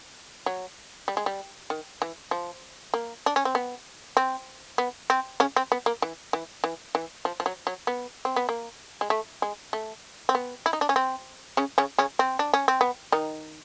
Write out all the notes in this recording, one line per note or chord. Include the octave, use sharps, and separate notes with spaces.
F#3
G3
G#3
G3
D#3
E3
F3
A#3
D4
C#4
C4
B3
C4
B3
C4
C#3 C#4
C4
B3
A#3
E3
E3
E3
E3
F3
F3
F#3
F#3
B3
C4
B3
A#3
G#3
A3
G#3
A3
C4
B3
E4
D#4
D4
C#4
C4
C#3 C#4
C#3 C#4
C#3 C#4
C4
D4
C#4
C4
B3
D#3 D#4